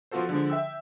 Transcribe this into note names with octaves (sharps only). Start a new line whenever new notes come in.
F3 B3 F4 F#4 A4 C5
D3 F3 G#3
E5 G5 E6